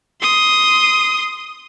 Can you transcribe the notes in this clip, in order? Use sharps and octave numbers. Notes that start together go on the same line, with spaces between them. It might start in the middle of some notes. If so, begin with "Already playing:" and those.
C6 D#6